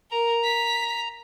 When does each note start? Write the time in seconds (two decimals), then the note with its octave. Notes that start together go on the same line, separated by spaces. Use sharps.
0.11 A#4 A#5
0.44 B6